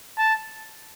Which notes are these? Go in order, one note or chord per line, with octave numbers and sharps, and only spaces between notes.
A5